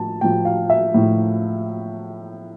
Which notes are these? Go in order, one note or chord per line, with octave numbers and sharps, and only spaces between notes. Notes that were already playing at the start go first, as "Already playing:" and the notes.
Already playing: A2 F3 A5
A2 F3 G5
F5
E5
A2 F3